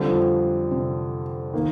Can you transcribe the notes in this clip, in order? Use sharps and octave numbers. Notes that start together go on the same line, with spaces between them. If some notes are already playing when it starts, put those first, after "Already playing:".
Already playing: D3 G3 C4 F4
F2
C3
D#3 A#3